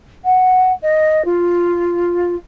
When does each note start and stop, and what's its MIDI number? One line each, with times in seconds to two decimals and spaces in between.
0.24 0.73 78
0.82 1.22 75
1.25 2.35 65